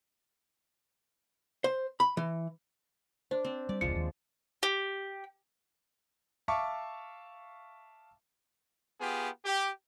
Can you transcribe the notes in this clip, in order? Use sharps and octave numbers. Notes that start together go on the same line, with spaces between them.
C5
B5
E3
D4 C5
C4
G3 D5
E1 C#2 F3 G#3 C#7
D#2
G4
E5 F5 A5 C#6 D6
B3 F4 G4 G#4
G4